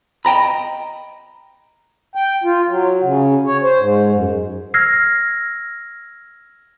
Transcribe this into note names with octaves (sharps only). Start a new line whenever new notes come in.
D#5 G5 A#5 B5
G5
F4
F#3
C#3
C#5
C5
G#2
F#2
E6 F6 G#6 A#6 C7